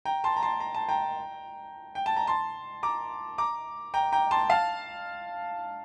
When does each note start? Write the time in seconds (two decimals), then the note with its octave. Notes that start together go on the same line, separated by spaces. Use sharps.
0.05 G5 A#5
0.24 A5 C6
0.37 A#5
0.42 A5 C6
0.60 A#5
0.75 A5
0.88 G5 A#5
1.95 G5
2.06 A5
2.17 A#5
2.27 A5 C6
2.83 A#5 D6
3.38 A#5 D6
3.94 G5 A#5
4.12 G5 A#5
4.31 A5 C6
4.50 F5 A5